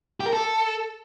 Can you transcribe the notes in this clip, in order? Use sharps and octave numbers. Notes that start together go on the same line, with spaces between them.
G4
A#4
A4